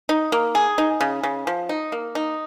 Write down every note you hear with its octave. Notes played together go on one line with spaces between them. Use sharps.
D#4
A#3
G#4
D#4
C#3
C#3
F3
D#4
A#3
D#4